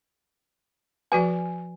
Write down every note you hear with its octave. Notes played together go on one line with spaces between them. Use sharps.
F3 F#4 B4 G#5